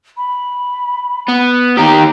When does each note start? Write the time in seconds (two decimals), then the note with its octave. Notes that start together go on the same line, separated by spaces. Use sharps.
0.17 B5
1.29 B3
1.77 D#3 G4 A#5